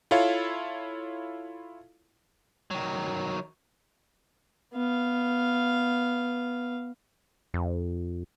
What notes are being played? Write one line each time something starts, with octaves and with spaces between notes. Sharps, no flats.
E4 F4 A4 C#5 F5
D#3 F#3
B3 F5
F2